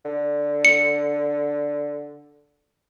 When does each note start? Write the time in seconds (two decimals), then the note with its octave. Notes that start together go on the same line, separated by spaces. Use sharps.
0.05 D3
0.65 C#7